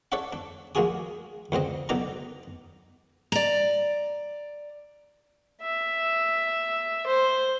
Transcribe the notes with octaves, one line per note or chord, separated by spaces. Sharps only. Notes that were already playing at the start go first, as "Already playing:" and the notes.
A4 C#5 D5 E5 F#5
D4
A#1 G#3 A#3 F#4 G#4 D#6
C#2 D3 C4 D#5
B1 B2 D#4 D5 A#5
D5 A#5
E5
C5